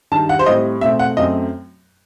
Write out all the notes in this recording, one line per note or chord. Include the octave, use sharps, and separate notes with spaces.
G2 D#3 G3 A5
F#5
C5
A2 G3 C4 D#5
B2 A3 C4 E5
F#5
F#2 F#3 A3 C4 D#5